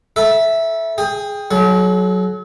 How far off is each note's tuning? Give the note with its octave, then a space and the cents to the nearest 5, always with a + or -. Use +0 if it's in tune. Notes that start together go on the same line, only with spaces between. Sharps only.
A4 +0 E5 +0 B5 -35
G#4 +0 G5 +25
F#3 +5 A4 -45